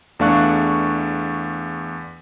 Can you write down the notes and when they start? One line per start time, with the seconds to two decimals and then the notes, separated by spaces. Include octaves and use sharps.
0.19 E2 A3 D4 F5 C#6 F#6